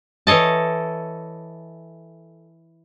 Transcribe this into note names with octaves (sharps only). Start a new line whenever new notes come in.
E3 A4 C#5 D#5 A5